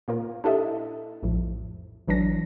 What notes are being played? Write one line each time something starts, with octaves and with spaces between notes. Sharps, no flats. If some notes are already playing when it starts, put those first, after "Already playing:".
A#2 A#3 F4 A#4
D4 E4 G4 A4 D#5 E5
A#1 F2 A2 F3
A1 E3 F#3 D4 A#6